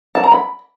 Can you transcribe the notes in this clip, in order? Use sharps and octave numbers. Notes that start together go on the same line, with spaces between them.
A5
A#5
B5